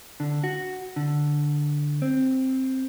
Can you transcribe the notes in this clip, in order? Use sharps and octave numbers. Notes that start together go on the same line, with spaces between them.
D3
F#4
D3
C4